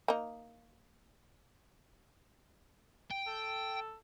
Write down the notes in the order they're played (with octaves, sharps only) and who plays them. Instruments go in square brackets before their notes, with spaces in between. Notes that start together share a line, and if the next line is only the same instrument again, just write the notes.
[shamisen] A#3 D#4
[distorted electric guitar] G5
[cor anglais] A4